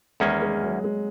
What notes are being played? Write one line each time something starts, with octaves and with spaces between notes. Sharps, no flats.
E2 D#3 G#3 A#3 C#4
G#3
F#3
G#3